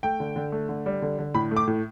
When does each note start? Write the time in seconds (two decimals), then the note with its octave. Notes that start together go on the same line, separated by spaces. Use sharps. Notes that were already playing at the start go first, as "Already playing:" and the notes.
0.03 A3 G5
0.20 D3
0.36 D3
0.52 A3
0.69 D3
0.86 G3
1.02 D3
1.19 D3
1.34 A2 B5
1.51 A3
1.56 D6
1.67 A2